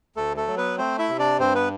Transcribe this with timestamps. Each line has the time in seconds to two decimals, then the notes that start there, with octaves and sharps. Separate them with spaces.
0.16 D2 A3 A4
0.37 A3 A4
0.47 F#3
0.57 B3 B4
0.78 A3 C4 C5
0.99 E4 E5
1.09 C3
1.19 D4 D5
1.40 G2 C4 C5
1.55 B3 B4